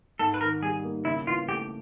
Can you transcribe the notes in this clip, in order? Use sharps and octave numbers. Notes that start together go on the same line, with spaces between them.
G#2 A4
B4
D#3 A#4
G3 G#4
A#3
C#3 E4
E3 F4
A3 G4